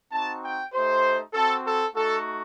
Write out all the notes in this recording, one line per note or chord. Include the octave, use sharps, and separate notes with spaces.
C4 D#4 F#4 A5
G5
A3 D#4 G4 C5
C4 F#4 A4
A4
A3 D#4 F#4 A4